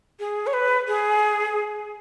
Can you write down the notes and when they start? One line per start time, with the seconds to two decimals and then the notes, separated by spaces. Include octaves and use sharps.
0.20 G#4
0.47 C#5
0.53 B4
0.88 G#4